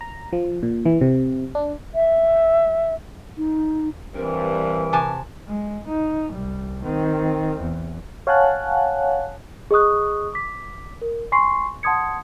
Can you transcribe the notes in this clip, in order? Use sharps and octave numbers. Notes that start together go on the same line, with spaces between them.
A#5
F3
A#2
E3
C3
D4
E5
D#4
G2 E3 G3 C4 A#4
C3 G#5 A5
G#3
D#4
C2 G3
D#3 C4
E2
C#5 F5 F#5 G#5 A5 F#6
G#4 D#5 C#6 D#6 F#6
D6 B6
A#4
G#5 C6 C#6 C7
F#5 A5 C6 D#6 G#6 C#7